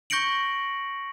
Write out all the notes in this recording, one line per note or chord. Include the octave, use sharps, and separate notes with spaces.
C#6 G6 A#6 C#7 D7 F#7